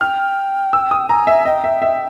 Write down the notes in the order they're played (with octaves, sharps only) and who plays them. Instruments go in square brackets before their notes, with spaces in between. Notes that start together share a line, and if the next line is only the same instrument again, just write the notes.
[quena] G5 [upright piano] F6
[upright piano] E6
D#6
[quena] G#5 [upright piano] A#5
[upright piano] E5
[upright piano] D#5 [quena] G5
[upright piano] E5
E5